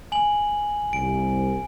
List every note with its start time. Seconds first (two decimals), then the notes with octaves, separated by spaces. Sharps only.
0.12 G#5 F#7
0.93 C2 D7